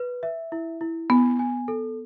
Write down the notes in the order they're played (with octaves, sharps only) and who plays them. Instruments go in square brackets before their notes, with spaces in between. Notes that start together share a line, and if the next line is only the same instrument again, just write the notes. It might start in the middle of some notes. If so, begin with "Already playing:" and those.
Already playing: [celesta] B4
E5
E4
E4
[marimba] B3 [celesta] G#5
[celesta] G#5
A4